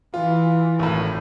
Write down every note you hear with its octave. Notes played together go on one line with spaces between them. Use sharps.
E3 F4
G#1 A2